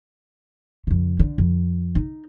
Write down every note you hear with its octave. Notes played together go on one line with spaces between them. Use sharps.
F2 C#3
D3
F2
D#4